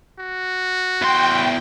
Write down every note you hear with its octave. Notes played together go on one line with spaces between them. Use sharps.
F#4
E2 G5 C6